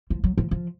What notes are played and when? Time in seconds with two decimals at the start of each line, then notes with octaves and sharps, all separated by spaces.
0.10 F3
0.24 F#3
0.38 F3
0.51 F3